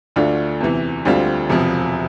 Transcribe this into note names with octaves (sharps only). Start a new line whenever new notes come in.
D2 D3 A3 D4 F4
E2 C3 E3
D2 D3 G3 C4 F4
E1 E2 C3 F3